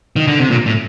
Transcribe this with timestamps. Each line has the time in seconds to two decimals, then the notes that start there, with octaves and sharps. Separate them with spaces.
0.16 D#3
0.27 D3
0.39 C3
0.50 A#2
0.66 A2